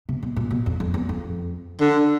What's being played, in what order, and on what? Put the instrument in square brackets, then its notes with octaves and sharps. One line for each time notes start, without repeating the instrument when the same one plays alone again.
[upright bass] C3
B2
A#2
B2
F2
F2
E2
F2
[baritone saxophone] D3